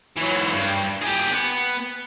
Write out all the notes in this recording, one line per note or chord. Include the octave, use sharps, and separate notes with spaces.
E3 F#3
G2
G4 G#4
B3